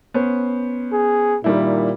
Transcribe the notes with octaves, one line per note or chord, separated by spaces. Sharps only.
B3 C#4 C5
G#4
A#2 D#3 G3 E4